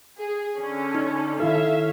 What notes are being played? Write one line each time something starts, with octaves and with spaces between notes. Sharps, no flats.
G#4
D3 C#4
D#4
D#3 E4 A4 C#5 E5 F5